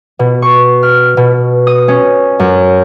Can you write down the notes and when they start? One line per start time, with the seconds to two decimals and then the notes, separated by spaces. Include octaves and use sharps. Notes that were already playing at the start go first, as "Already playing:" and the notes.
0.19 B2
0.42 C#6
0.83 F6
1.17 B2
1.67 D#6
1.88 C#4
2.39 F#2